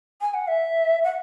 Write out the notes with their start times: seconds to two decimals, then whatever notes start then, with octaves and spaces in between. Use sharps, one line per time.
0.21 G#5
0.34 F#5
0.48 E5
1.04 F#5